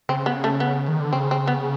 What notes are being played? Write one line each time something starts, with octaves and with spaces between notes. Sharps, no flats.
C#3 C4
B3
A3
B3
D#3
D3
C#3 C4
C4
B3